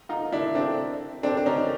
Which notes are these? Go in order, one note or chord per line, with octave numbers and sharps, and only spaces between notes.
D#4 F4
D4 E4
C4 D4
C4 D4
D4
C#4 D#4